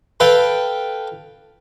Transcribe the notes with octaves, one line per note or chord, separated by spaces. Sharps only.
A4 B4 F5 G5